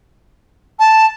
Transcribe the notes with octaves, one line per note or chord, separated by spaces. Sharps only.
A5